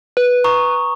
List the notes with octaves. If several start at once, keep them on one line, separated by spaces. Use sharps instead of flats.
B4
A#5 C#6 D#6